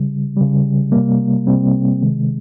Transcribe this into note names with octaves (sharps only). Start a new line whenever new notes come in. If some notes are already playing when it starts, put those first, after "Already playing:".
Already playing: C#3 G3
C#3 G3
C3 G3 A#3
C3 G3 C4
C3 D#3 G#3